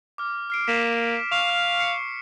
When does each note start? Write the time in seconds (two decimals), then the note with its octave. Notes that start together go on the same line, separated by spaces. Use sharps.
0.18 D6 F6
0.50 F6 C7 D7
0.68 A#3 B6 E7
1.32 F5 C#6
1.50 F6
1.80 C7 C#7